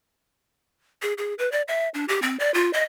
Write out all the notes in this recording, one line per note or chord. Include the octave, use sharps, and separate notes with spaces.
G#4
G#4
B4
D5
E5
D4
G4
C4
D5
F4
D#5